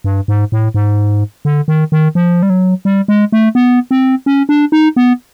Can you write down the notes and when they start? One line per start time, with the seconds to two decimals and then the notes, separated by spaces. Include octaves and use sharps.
0.04 G2
0.28 G#2
0.52 A2
0.74 G#2
1.45 D3
1.68 D#3
1.92 D#3
2.15 F3
2.43 G3
2.50 F#3
2.85 G3
3.08 G#3
3.32 A3
3.55 B3
3.91 C4
4.26 C#4
4.49 D4
4.72 D#4
4.96 B3